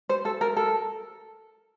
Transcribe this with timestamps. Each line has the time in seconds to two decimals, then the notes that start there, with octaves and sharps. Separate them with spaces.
0.09 C5
0.25 A4
0.41 A#4
0.57 A4